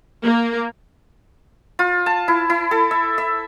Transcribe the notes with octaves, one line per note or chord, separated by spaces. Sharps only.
A#3
F4
A5
E4
E4
A4
E5
E5